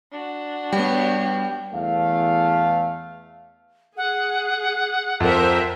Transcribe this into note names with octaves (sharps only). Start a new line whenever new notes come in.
D4 F#4
G3 B3 C#5 G5
E2 A3 F5
G#4 F#5
F2 A#4 C5 E5